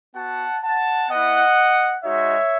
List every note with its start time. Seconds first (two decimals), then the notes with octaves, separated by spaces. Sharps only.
0.15 B3 F#4 F#5 A5
0.63 F#5 A5
1.10 B3 E4 D#5 F#5
2.04 G#3 D#4 F#4 C#5 E5